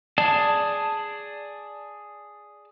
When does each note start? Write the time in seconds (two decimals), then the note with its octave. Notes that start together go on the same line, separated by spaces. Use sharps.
0.18 G#4 D5 A5